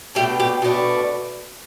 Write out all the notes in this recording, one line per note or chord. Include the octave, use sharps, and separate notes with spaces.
B2 A3 D4 G4
G4
B2 A3 D4